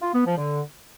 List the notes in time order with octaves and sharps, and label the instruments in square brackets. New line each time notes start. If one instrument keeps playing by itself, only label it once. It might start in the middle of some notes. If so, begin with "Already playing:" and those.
[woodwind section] F4
B3
F3
D3